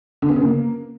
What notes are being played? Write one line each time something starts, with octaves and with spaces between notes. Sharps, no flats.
D3
B3
C#3
A#3